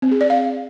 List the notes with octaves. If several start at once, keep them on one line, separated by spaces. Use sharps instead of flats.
C4
G#4
D5
F5